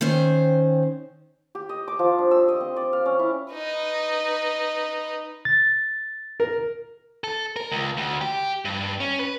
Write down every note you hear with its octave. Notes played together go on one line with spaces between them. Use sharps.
D#3 C4 C#4 C5
G4
D#5
D6
F3
D4
E6
D#5
C4
D5
F5
C#4
E4
D#4 B4
A6
A#4
A4
A#4
C#2
D2
G4
G2
C#4
B4